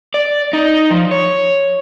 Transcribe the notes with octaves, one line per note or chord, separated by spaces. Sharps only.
D5
D#4
F3
C#5